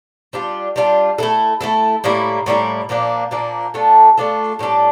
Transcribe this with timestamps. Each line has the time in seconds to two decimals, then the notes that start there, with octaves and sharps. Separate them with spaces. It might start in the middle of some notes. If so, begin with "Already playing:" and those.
0.33 G3 D4 F4
0.76 G3 D4 F4
1.18 A3 E4 A4
1.61 A3 E4 A4
2.04 A2 G3 A#3 E4
2.46 A2 G3 A#3 E4
2.89 A#2 F3 A#3 D4
3.31 A#2 F3 A#3 D4
3.74 A3 D4 F4 A4
4.17 A3 D4 F4 A4
4.59 A2 G3 D4 A4